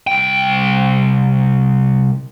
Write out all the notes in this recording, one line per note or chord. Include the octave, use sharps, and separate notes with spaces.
C2 G5